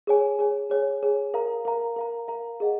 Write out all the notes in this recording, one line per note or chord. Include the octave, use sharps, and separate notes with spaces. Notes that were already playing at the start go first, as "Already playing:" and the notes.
G#4 C#5 G#5
G#4 C#5 G#5
G#4 C#5 G#5
G#4 C#5 G#5
A#4 F5 A#5
A#4 F5 A#5
A#4 F5 A#5
A#4 F5 A#5
G#4 D#5 F#5